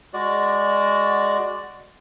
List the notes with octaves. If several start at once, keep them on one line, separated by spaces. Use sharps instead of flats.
G#3 F#4 D5